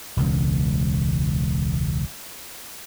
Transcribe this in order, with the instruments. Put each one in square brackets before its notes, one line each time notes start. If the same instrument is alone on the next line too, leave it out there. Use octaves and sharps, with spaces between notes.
[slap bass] E1 C#2